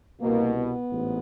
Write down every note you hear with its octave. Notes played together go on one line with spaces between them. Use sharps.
C2 B2 A#3
B3
A1 G#2